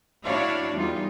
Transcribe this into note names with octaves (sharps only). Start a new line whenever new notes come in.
D4 E4 F#4 C#5 D5 F5
E2 G3 D#4 F4